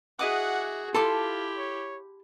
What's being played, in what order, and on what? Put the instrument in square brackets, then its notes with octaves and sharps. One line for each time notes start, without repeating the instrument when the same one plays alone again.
[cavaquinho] E4 D#5 D6 [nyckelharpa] F#4 G#4 [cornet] F#5
[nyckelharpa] E4 G4 [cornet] F4 [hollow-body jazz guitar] A4 [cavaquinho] A5 C6 D6
[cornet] C#5